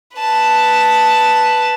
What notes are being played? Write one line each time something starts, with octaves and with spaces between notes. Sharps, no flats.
B4 A5